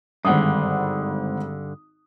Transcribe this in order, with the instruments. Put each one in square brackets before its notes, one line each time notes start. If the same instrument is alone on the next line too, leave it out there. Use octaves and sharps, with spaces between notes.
[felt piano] G#1 F#5 D#6 [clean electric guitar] G2 D3